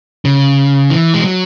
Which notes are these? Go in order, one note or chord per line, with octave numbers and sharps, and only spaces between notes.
C#3
E3
G#3
F#3